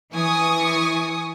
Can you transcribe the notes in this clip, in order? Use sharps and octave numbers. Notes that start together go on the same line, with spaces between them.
E3 G#5 C#6 D#6